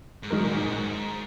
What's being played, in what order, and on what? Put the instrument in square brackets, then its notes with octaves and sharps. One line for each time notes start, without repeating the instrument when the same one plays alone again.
[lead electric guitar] G#2
[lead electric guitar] F#2 [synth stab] D#3 G#3 D#4 F#4 A#4
[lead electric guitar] A#2
G#2
F#2
G#2